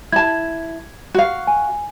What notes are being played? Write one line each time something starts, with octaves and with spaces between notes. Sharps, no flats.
E4 A5 G#6
F#4 F5
G#5